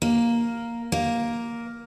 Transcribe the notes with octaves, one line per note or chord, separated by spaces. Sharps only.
A#3
A#3